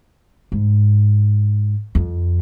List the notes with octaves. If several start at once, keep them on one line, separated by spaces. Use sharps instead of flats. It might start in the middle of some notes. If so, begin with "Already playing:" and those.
G#2
F2